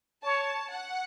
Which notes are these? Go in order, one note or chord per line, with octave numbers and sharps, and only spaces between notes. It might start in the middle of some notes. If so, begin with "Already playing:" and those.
C#5 A5
F#5